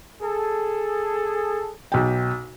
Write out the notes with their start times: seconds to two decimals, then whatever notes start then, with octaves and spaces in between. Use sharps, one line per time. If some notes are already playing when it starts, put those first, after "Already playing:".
0.22 G#4 A4
1.92 B1 G5